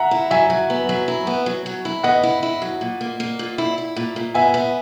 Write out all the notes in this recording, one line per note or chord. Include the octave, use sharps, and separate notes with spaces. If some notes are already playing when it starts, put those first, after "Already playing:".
Already playing: E5 F#5 A#5
E4
F#3 E5 G#5
F#3
B3
F#3
E4
B3
F#3
F#3
E4
B3 D#5 F#5
E4
E4
F#3
A#2
A#3
A#3
A#2
E4
E4
A#2
A#2
B3 E5 G#5
B3